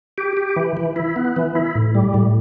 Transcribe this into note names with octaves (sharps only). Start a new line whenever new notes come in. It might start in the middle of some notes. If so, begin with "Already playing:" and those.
G4
G4
E3
E3
E4
B3
E3
E4
A2
G3
A2